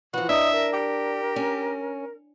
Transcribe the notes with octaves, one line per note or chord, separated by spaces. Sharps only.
E3 F3 F#4
D4 D#5 E5 A#5 D#6
A#4
G4
C#4